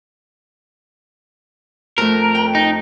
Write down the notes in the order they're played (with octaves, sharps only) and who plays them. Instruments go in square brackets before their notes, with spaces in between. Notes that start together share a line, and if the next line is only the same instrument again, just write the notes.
[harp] F2 A3 [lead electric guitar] A#4
[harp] G5
[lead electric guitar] D#4